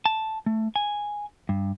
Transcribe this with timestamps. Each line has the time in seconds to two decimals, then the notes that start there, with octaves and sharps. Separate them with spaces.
0.06 A5
0.46 A3
0.76 G#5
1.49 G2